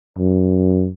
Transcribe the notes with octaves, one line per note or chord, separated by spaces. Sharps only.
F#2